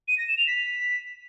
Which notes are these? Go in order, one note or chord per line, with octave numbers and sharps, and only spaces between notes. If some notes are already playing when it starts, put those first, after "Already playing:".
D#7
A#6
E7
F7
B6